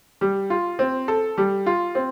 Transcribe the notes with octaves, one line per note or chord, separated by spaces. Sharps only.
G3
F4
C4
A4
G3
F4
C4